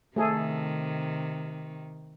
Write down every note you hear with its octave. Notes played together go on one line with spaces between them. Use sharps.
C3 D#3 A3 G#4 A4